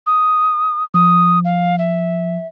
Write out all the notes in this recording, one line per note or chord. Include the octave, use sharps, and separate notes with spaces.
D#6
F3 D#6
F5
E5